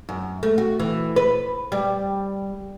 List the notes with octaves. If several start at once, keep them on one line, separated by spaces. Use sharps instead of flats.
F#2
A3
F#4
E3
B4
G3